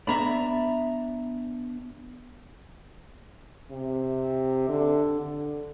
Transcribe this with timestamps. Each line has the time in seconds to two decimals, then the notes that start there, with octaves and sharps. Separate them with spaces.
0.07 B3 D4 D5 E5 A#5 B5
3.71 C3
4.69 D3
5.21 D3